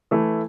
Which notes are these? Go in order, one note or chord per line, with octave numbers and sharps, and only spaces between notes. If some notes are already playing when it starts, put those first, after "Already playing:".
E3 A3 E4